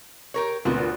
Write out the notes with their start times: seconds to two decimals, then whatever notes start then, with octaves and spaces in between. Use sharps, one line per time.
0.34 G4 A#4 C#5
0.65 D2 A#2 B3 C4 F#4